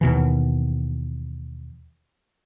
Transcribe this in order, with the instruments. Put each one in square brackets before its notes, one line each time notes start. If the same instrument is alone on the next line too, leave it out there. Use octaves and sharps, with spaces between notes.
[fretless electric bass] D#2 B2 E3